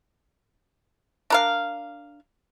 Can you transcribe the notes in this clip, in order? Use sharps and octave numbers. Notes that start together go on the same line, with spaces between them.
D4 A#4 F5